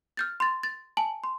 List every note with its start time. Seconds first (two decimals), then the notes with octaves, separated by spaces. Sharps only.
0.17 F6 G6 A6
0.40 C6 A6
0.63 A6
0.97 G#5 A5 F#7
1.24 C6